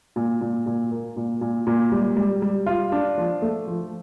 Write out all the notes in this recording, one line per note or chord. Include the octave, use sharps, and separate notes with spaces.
A#2
A#2
A#2
A#3
A#2
A#2
A#2
G3
G3
G3
F4
D4
F3
A3
F3